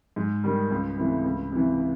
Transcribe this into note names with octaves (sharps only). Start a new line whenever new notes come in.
G#2
D#3 G3
C#2
C3 E3 A3
C#2
C3 E3